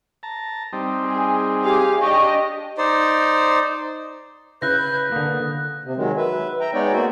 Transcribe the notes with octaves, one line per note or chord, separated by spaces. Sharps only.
A5 A#5
G3 C4 D#4
G#4
G4 G#4 F5
D4 G4 D#5 C#6
D#4 C5 D5
C#3 E4 B4 F#6 G6 A#6
D3 A#3 D#6
C3
D#3 F#3 G#3
B4 E5
E5 G5 A#5
G#3 B3 D#4 C#5 D5 G5
A#3 F#4 E5